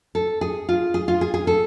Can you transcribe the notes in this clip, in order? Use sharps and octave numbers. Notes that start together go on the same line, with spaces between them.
A4
G#4
F4
G#4
F4
G#4
G#4
A4